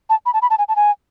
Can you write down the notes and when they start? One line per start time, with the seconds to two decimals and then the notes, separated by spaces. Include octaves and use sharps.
0.10 A5
0.26 B5
0.34 A5
0.42 B5
0.50 A5
0.59 G#5
0.68 A5
0.76 G#5